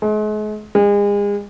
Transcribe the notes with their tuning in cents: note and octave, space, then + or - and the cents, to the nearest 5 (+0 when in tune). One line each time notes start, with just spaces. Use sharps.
G#3 +40
G#3 -35